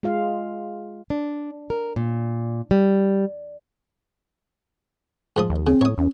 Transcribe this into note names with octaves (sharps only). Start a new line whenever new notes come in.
G#3 F4 F5
D4
A#4
A#2
G3
G#2 F3 D#6
D#2
C#3 C4
A2 C#5 D#6
E2 C#4